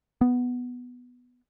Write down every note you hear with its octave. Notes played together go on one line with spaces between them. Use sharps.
B3